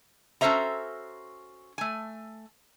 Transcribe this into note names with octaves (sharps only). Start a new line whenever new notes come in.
C#4 F#4 A4 C5 E5 A#5
A3 G#5